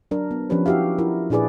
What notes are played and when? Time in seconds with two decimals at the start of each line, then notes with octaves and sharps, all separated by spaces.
0.11 F#3 D4 A#4
0.31 B3
0.50 F3 C#4 D4 G4 B4 C#5
0.66 E4 F#4 G4 E5 F5
0.98 E4 F4 A#4
1.30 A#2 D4 E4 G#4 B4 D5